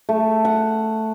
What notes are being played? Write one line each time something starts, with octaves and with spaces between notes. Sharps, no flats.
A3
F#5